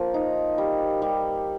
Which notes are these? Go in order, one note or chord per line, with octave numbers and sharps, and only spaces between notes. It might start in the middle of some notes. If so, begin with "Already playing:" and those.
Already playing: F3 A#3
D#4
G3
G3